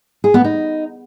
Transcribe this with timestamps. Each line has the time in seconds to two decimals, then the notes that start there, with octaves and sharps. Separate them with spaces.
0.24 G#4
0.34 B3
0.44 D#4